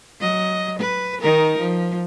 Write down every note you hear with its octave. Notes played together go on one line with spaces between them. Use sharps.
F#3 D#5
B4
D#3 D#4 A#4
F3